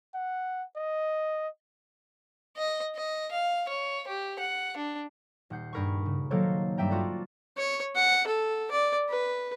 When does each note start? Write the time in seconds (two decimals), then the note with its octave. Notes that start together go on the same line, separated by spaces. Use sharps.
0.14 F#5
0.76 D#5
2.57 D#5
2.96 D#5
3.32 F5
3.68 C#5
4.08 G4
4.39 F#5
4.77 D4
5.50 D#1 F#5 G6 C7
5.73 G2 G#4 A#4 B5 C#6
6.06 C#3
6.31 D#3 F#3 A#3 A4 C5 C#5
6.78 G2 G3 E5 G5 A#5
6.90 F4 F#4 A4 D5
7.57 C#5
7.96 F#5
8.27 A4
8.71 D5
9.09 B4